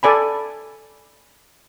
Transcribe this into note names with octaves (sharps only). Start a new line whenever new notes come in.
A4 D5 G#5 B5